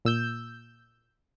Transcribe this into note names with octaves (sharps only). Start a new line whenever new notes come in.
A#2 E6 G6